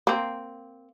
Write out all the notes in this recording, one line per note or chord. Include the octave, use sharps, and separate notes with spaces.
A#3 C4